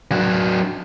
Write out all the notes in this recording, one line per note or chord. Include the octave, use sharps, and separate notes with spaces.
F#3 D4